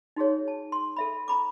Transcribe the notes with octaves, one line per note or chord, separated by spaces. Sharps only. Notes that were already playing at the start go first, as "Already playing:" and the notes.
D#4 F#4 G#4 C#5
A5
C6
A4 E5 B5
A#5 B5 D6